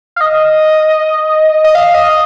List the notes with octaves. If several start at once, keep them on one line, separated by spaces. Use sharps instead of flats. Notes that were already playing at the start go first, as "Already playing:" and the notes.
F5
D#5
D#5
F5
D#5